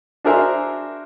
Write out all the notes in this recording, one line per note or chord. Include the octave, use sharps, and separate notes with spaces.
D4 F#4 G#4 A#4 C5 E5